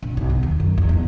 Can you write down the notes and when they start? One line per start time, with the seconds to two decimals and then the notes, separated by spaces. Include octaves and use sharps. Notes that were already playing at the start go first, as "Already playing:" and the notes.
0.02 A#1
0.17 B1
0.29 D#3
0.43 D#2
0.60 F#2
0.78 E2
0.89 G#2